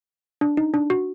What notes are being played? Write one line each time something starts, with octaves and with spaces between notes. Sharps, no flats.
D4
D#4
D4
F#4